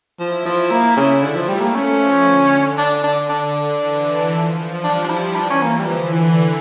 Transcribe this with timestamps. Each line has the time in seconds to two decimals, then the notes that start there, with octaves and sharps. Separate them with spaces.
0.19 F3 E4
0.45 F3
0.70 A#3 E4
0.97 C#3
1.23 D3 A3
1.36 F3
1.49 G3
1.61 A#3
1.74 F3 C#4
2.26 D3
2.78 D4
3.04 D4
3.29 D4
3.81 E3
4.32 F3
4.84 G3 D4
5.04 D4
5.10 E4
5.36 E3 D4
5.50 C#4
5.62 A#3
5.79 G3
5.87 D3 F3
6.12 E3